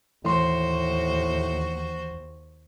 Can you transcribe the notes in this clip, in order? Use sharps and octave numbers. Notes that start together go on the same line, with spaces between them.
D#2 A2 E3 F#4 C5 C6